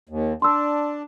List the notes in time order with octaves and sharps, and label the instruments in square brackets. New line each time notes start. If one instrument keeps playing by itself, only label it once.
[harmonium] D#2
[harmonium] D4 [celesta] C6 E6